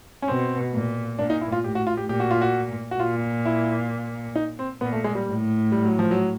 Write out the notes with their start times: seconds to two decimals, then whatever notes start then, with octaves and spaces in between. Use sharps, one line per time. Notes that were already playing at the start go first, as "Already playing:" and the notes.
0.22 C#4
0.28 B2 C4
0.74 A#2
1.19 A#2 D4
1.30 D#4
1.41 E4
1.52 F4
1.64 A2 G4
1.75 F#4
1.87 F4
1.97 G4
2.09 A#2 G4
2.20 F#4
2.31 F4
2.42 F#4
2.91 F#4
3.00 A#2 F4
3.45 E4
4.36 D#4
4.59 C4
4.81 A#2 B3
4.93 A3
5.04 G#3
5.15 G3
5.27 A2
5.72 G3
5.85 F#3
5.99 F3
6.11 F#3